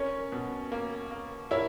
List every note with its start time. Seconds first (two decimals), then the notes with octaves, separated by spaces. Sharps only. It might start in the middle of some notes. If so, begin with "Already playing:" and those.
Already playing: C#4 A#4 C#5
0.32 B2
0.72 A#3
1.11 A#3
1.51 E4 A#4 C#5